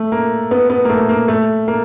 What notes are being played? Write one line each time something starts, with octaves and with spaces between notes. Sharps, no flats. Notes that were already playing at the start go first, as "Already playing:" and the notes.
Already playing: A3
A#3
B3
B3
A#3
A3
A#3
A3
A#3